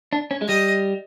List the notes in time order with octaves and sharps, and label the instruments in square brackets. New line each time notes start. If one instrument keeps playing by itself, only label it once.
[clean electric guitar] D4
C#4
G#3
[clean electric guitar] G3 [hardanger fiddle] D#5